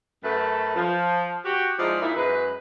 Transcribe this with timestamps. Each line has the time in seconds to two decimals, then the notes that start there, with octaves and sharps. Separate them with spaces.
0.24 F#2 A3 B4
0.75 F3
1.45 F#4 G4
1.79 F3 G#3 D#4 E4 D5 D#5
2.01 A#2 D#4 E4
2.16 F#2 G#3 B4